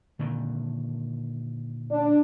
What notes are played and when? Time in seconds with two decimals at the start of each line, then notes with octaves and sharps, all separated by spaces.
0.19 A#2 D3 D#3
1.91 D4